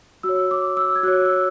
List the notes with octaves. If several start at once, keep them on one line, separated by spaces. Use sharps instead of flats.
F#4 E6
C#5
D6
E6
G#6
F#4 C#5 F#6
E6